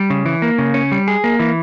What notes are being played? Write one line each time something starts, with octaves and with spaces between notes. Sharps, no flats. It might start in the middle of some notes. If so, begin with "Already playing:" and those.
Already playing: G3
C#3
E3
A#3
C#3
C#4
G3
G#4
A#3
E3